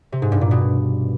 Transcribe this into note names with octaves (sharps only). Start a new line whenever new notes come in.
C3
G#2
G2
A#2
B2